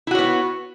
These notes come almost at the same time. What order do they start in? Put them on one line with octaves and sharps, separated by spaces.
E4 F#4 C#5 B3